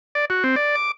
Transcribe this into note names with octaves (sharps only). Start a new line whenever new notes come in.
D5
F#4
C4
D5
D6